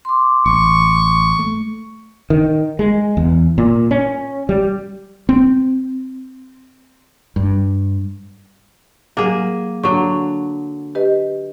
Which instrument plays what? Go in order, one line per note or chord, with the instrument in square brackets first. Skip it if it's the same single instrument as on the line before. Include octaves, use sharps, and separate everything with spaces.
[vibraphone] C6 D6
[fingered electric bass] A1 [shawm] C#6
[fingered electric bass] A3
[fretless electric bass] D#3
G#3
E2
A#2
C#4
G3
C4
G2
[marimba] F#3 [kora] A#3 G#4
[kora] D3 F#3 [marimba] C#6
[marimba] G4 B4 D#5